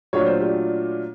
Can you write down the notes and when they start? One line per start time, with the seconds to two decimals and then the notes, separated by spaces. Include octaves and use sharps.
0.13 A#2 F#3 A3 D4 F4 C#5
0.26 C5
0.40 G4